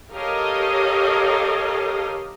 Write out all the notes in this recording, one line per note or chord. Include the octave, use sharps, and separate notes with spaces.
G4 A4 A#4 C#5 D#5 F5